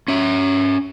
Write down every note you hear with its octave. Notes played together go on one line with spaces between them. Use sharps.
C#4 E5